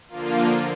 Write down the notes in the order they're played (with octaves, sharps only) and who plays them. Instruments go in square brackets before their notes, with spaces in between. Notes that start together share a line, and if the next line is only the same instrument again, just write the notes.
[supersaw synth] D3 F3 A#3 F4